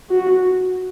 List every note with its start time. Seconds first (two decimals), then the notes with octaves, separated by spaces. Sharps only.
0.10 F#4